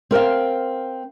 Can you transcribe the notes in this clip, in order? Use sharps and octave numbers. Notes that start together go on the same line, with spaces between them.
C4 A#4 C5 F5